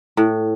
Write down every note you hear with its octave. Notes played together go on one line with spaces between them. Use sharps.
A2